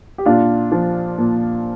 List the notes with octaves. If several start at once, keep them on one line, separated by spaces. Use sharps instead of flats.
G4
A#2 D4 F4
F3
A#2